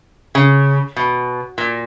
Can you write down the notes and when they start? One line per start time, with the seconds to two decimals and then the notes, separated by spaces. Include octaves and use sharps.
0.35 C#3
0.96 B2
1.58 A#2